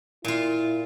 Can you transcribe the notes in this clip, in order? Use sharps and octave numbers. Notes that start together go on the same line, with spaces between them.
A#2 E4 F4